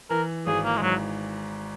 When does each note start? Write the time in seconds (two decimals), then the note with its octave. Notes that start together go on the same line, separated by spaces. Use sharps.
0.10 E3 A#4
0.47 G#1 G#4
0.64 A#3
0.77 G#3
0.82 G#2 F#3